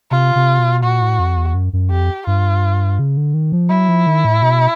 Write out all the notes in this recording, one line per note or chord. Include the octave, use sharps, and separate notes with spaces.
C3 F4
C3
B2
A#2 F#4
A2
F2
E2
F#2
F#2
F2 G4
G2 F4
C#3
D3
D#3
F3
F#3 E4
F3
D#3
A2
B2